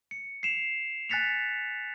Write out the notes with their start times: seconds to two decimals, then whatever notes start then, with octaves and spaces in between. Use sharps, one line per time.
0.11 C#7
0.43 C7 E7 F7
1.09 G#5 F#6 A6 B6 C#7 F7